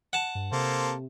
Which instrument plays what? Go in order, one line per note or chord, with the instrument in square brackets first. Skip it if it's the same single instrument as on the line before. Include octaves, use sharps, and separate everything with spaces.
[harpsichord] F#5 A5
[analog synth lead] G2
[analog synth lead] C3 [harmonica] A#3 A4 C5